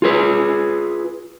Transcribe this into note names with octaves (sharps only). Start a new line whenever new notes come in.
F4 G#4 B4